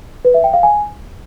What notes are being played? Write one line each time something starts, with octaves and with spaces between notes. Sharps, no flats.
B4
E5
G5
F5
G#5